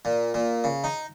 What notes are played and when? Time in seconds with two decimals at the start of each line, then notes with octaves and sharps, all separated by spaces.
0.05 A#2
0.34 A#2
0.64 C#3
0.84 D#4